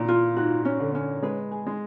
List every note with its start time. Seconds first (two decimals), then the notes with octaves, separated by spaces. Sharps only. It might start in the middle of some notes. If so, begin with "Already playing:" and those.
Already playing: A#2 E3
0.08 F4
0.36 G#2 F#4
0.65 C#4
0.80 D3
0.95 C#4
1.22 G#3 B4
1.52 G#4
1.67 G#3